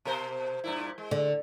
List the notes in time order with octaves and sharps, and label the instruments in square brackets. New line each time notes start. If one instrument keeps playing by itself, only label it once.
[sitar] B2 A#4 C5
G2 A#2 E4
G#3
[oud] D3